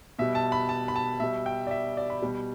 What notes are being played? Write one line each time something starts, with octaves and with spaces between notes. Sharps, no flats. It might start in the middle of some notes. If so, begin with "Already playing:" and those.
B2 G3 E5
A5
B5
A5
B5
A5
B2 G3 E5
G5
D5
E5
D5
B5
B2 G3